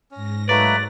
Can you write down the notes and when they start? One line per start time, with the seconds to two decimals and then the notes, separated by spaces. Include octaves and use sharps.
0.11 G#2 C#4 A#6
0.49 F#3 A3 A#3 D#4 B4 D5